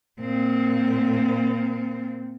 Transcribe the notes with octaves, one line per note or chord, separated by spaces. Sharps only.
A#2 C4